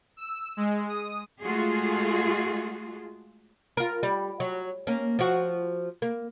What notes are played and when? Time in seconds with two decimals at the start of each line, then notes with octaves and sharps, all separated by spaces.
0.17 E6
0.57 G#3
0.89 D#6
1.43 G#3 A3 F4 F#4 G#4
3.77 F4 A#4
4.03 G3
4.40 F#3
4.87 A#3 C#4
5.19 F3 F#4
6.02 A#3